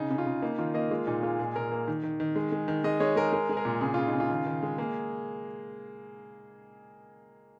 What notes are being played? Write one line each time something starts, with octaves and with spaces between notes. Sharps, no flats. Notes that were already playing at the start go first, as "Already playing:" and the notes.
Already playing: C#3 D#4
C#3
F4
C#3
A#3 D#4
D#3 F4
A#3 D#5
G#3 F4
A#2 D#4
G#3 F4
A#2 G#4
A#2 A#4
A#3
D#3
D#3
D#3
G#3
G#3
D#3
G#3 D#5
G#3 C#5
G#3 A#4
G#3 A#4
G#3 G#4
A#4
A#2
C#3 G#4
C#3 F4
D#4
C#3
F4
D#3
D#3
G#3
A#3 G#4